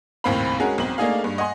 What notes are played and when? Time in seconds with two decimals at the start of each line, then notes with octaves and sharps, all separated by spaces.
0.24 F#1 D#2 A2 C4 F5 B5
0.60 G#3 C#4 F#4 G#4 A#4
0.78 B1 C4 F#7
0.98 A3 A#3 D4 D#4 G#4 F5
1.24 G2
1.38 D#5 F#5 G#5 C6